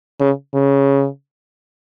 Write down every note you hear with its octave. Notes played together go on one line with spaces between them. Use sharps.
C#3
C#3